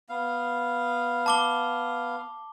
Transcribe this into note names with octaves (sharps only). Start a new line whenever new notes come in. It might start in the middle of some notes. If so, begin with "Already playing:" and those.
B3 F5
A5 D6 G7